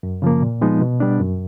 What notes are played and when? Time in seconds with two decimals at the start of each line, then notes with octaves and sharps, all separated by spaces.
0.03 F#2
0.22 C#3 F3 A#3
0.42 A#2
0.61 F3 G#3 B3 D#4
0.81 B2
1.00 G3 B3 D4
1.20 F#2